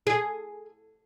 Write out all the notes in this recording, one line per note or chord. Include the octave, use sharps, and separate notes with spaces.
G#4